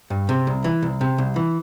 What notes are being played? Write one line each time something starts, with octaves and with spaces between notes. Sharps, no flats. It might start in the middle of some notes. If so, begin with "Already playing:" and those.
G2
C3
C2
E3
C2
C3
C2
E3